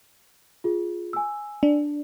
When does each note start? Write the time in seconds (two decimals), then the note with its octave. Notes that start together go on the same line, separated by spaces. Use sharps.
0.64 F4 G#4
1.13 G#5 E6
1.63 D4